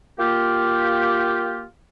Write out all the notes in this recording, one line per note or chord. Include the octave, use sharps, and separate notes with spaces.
A#3 F4 G4